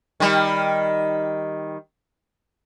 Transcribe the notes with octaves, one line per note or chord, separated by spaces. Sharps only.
D#3 G3